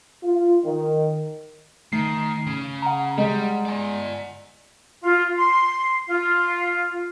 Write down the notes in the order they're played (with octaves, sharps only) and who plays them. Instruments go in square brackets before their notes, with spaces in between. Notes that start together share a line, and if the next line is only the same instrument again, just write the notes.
[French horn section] F4
D#3
[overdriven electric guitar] D#3 [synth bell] A3 C7
[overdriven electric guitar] C#3
[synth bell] F#5 A#5
[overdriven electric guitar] G3 [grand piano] G#3
[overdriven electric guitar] D5 G#5
[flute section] F4
C6
F4